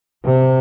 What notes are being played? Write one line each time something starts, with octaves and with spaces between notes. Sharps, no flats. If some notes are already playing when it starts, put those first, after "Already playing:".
C3